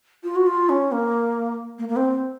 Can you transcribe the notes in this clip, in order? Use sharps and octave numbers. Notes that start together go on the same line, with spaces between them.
F4
F#4
F4
C#4
A#3
A#3
A#3
C4